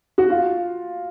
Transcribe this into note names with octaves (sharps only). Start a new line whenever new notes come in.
F#4
F4